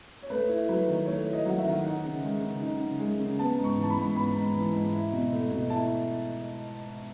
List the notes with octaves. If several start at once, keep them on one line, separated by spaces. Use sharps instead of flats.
C#5
A3 B4
E4
F#3 B4
D#3
A3 C#5
E4
D#5
F#3 F#5
E5
D#3
D#4 F#5
C#3
G#3
C#3
D#4
C#3
G#3
C#3
B3 A5
G#2
C#6
E3
A5
B5
G#2
B3 B5
G#2
E3
G#2
E4
B2
A3
B2
E4 A5